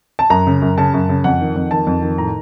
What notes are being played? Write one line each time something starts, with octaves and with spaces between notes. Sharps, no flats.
A5
F#2 A#5
C#3
F#2
C#3 A5
F#2
C#3
F2 F#5
D#3
F2
D#3 A5
F2
D#3
A2 A#5